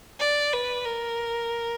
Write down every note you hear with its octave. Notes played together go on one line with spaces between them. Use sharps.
D5
B4
A#4